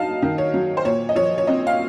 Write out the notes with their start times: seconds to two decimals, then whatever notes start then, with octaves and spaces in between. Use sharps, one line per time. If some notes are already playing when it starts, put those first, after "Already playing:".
Already playing: F#3 D#4 F5 A5
0.22 D#3
0.38 C#5
0.54 F#3
0.77 C5
0.85 A#2 C#5
1.09 D#5
1.15 F3 C#5
1.38 C#5
1.47 C4 D#5
1.67 F5